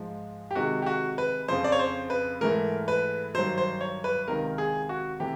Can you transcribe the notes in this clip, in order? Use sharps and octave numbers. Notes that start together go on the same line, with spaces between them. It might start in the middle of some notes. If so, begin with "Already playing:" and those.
Already playing: G#2 F3 G#3
G4
C3 D#3 G#3 F#4
G4
F#4
B4
F2 C#3 F3 C5
D5
C#5
C5
B4
G#2 E3 A3 A#4
B4
G2 D#3 F#3 C5
C5
C#5
B4
C#2 C3 D#3 A#4
G#4
F#4
C3 E3 A3 G4